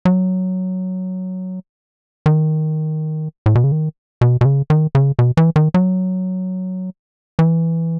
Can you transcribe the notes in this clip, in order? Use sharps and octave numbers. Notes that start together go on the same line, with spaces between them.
F#3
D#3
A2
B2
C#3
D#3
B2
B2
C#3
D#3
C#3
B2
E3
D#3
F#3
E3